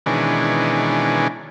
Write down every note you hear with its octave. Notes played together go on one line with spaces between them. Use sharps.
B2 D#3 E3 G#3 C#4 D4